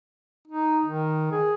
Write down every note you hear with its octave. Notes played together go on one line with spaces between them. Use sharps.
D#4
D#3
G#4